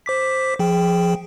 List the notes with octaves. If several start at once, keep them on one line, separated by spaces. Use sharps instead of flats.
C5 D6 B6
F3 G#4 G5